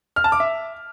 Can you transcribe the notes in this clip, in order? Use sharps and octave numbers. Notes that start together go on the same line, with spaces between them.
F6
A5
D6
E5